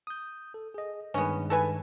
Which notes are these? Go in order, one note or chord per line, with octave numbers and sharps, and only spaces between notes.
D#6 G6
A4
G#4 D#5
G2 D#3 G#3 B3 C#4
A4 B4 G#5